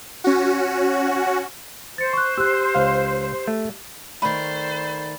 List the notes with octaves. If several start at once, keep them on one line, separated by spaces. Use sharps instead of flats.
C#4 F#4
C5 A6 C#7
C#6 F#6
G4 E6 F#6
C#2 F5
A3
D#3 A3 C5 D5 B5